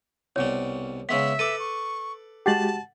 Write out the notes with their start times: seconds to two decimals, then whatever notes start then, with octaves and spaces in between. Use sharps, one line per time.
0.36 C2 B2 G3 C#5
1.09 C#3 G#3 B3 E5 B6
1.39 A4 B4 D6 D#7
1.59 C#6
2.46 G#3 F#4 G4 F#5 A5 A6 F#7